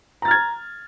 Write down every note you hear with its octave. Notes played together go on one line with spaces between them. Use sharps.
A#5 F6 G#6 A6